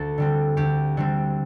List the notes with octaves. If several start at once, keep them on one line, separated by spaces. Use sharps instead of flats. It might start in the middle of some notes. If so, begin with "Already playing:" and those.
Already playing: D2 A4
D3 G3 C4
D2 G4
D3 G3 C4